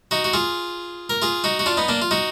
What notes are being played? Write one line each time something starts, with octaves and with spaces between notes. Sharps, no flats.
D#4 F#4
F#4
F4 G#4
A#4
F4 G#4
D#4 F#4
F#4
D4 F4
B3 D#4
A#3 D4
F4
D#4 F#4